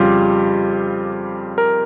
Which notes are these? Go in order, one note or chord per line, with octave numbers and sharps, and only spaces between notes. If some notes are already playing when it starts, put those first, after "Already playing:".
Already playing: F2 C#3 G3 F4 G4
A#4